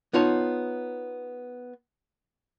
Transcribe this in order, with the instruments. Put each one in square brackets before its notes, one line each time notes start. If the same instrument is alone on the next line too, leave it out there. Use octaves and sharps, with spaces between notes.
[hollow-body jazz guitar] B3 D#4 F4 C#5 A5